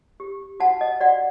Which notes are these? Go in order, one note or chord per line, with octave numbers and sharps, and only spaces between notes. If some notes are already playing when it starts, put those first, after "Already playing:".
G4
F#4 F#5 A5
D#5
F#4 D5 F#5